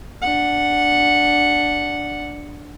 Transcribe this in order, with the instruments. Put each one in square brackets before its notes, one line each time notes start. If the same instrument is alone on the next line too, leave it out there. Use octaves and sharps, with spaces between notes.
[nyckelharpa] D4 F#5